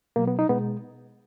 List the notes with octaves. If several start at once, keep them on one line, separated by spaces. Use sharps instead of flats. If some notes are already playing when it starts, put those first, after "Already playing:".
B2 F#3 A#3
B3
D#4
B2 G#3 B3